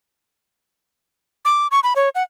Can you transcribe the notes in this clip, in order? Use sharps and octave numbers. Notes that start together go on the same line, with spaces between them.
D6
C#6
B5
C#5
F#5